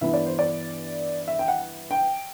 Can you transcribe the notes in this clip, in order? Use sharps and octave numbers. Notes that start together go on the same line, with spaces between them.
G2 E3 B3 E4 E5
D5
C5
D5
E5
G5
F#5
G5